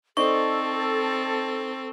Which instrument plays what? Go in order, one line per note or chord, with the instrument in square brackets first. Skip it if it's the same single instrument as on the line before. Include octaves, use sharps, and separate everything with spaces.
[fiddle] C4 [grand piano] D#4 C5 D5 [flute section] A4 [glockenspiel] C#6